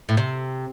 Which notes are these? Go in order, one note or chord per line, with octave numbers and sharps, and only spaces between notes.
A2
C3